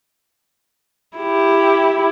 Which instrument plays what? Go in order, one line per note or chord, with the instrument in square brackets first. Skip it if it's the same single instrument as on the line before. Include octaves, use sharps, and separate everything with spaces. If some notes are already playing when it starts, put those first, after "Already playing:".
[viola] E4 G4